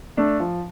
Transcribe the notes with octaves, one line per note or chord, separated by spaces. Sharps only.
A3 D4
F3